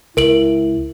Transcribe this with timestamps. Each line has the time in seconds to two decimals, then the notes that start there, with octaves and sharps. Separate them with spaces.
0.17 C#2 E4 A#4 D7 F#7